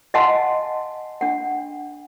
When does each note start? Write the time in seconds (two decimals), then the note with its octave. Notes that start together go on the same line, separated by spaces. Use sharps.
0.14 D#5 F5 F#5 G#5 A5 C6
1.21 D4 F#5